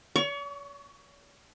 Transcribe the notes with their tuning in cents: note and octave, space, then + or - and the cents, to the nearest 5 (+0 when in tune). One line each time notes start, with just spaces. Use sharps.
C#5 +45 C#6 +15